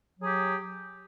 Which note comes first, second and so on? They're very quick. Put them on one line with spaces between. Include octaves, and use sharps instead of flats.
F#3 G#4 G4